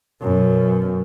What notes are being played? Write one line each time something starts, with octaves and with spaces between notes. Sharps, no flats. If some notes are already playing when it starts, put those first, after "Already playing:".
F#2 B2